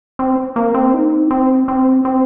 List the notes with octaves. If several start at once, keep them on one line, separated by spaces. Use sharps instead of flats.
C4
A#3
C4
D#4
C4
C4
C4